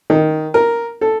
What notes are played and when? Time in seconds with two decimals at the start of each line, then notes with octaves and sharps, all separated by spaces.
0.10 D#3
0.54 A#4
1.01 A4